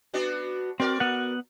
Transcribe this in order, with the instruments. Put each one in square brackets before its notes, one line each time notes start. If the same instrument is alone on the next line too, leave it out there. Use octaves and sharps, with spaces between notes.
[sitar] B3 D4 F#4
[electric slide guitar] C4 [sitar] F#4 A#4 D5
[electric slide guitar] B3 F#5